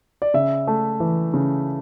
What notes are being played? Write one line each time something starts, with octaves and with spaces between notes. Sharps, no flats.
D5
C#3 E5
A3
E3
C#3